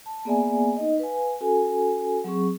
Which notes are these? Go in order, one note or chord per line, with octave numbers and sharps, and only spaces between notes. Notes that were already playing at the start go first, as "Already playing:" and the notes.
A5
A#3 B3 G#4 D5 E5 G#5
D#4 D#5
B4 F5 G#5
C#4 F#4 A4 G#5
F#3 C4 G#4 C#6